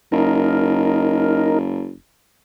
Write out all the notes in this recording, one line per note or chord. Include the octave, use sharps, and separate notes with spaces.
F#1 D#4 A#4